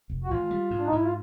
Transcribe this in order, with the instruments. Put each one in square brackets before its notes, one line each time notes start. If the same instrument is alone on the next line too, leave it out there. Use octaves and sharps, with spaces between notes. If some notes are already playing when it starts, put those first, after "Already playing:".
[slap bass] F1
[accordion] F#4
[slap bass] G#1 [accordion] F4
[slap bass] G3
G#2
[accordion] D4
D#4
[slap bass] G#2 [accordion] E4
[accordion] F4